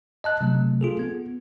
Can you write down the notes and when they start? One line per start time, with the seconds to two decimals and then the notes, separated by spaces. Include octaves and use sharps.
0.24 D#5 A5 F#6
0.41 C3 F#3 A3
0.81 F4 G#4 A4
0.99 B3